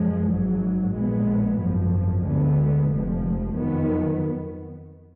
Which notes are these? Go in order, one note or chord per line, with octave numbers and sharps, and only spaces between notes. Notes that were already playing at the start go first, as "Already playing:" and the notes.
Already playing: F#2 F3 G#3
G#1 G#2 F#3
A#1 A#2 G#3 B3
G#1 F#2 F3
D2 D3 G#3 B3
F1 F2 F3 G#3
F2 D#3 F#3 B3